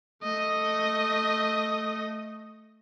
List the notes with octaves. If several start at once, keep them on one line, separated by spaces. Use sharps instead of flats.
A3 D#5